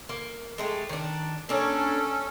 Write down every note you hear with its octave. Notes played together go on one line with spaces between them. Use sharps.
A#3
G#3 A3 G4
D#3 D4
A#3 C#4 D4 A4 C#5